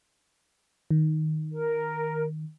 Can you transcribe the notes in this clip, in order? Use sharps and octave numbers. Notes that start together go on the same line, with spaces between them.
D#3
A#4